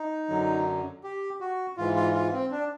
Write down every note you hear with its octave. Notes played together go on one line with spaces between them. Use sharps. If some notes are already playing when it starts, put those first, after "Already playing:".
Already playing: D#4
F#2 D3 F#3
G4
F#4
G#2 E3 F4
F4
F4
C4
D4